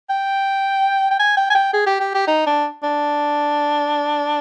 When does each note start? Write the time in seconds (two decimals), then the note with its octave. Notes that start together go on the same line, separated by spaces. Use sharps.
0.10 G5
1.11 G5
1.19 G#5
1.37 G5
1.50 G#5
1.54 G5
1.73 G#4
1.87 G4
2.00 G4
2.15 G4
2.27 D#4
2.46 D4
2.83 D4